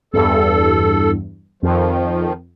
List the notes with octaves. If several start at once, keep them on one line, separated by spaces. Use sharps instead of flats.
E2 G2 A4
F2 D#3 F3